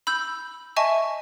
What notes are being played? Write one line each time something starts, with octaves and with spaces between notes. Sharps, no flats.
B5 E6 G6
D#5 E5 G#5 A5 C#6